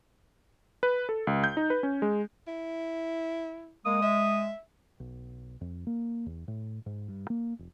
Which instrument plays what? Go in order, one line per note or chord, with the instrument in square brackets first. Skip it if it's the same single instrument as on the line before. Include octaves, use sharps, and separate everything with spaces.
[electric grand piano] B4
A4
C#2
G6
D#4
B4
C#4
G#3
[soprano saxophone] E4
[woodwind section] G#3 [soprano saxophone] A#3 [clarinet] D#6
[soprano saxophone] E5
[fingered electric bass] B1
F2
A#3
E2
A2
G#2
G2
A#3
F1